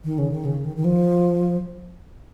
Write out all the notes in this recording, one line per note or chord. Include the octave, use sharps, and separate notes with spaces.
D#3
C#3
D#3
C#3
D#3
D#3
F3